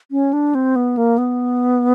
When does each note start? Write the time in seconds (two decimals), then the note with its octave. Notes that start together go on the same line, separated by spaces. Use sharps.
0.11 C#4
0.33 D4
0.55 C4
0.76 B3
0.97 A#3
1.18 B3